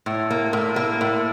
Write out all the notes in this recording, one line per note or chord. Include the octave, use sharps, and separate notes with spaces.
A2
A#3
A2
A#3
A2